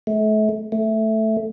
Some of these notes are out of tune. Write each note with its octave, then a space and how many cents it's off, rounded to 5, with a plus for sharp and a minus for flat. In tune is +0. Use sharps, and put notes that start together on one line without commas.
A3 -35
A3 +0